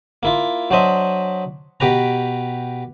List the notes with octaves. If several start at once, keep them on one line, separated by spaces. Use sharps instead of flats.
A#3 E4 F4
F#3 D4 C5 D#5 E5
B2 G4 B4 A#5